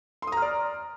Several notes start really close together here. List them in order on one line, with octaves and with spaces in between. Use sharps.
C6 D#6 A#5 F6 D5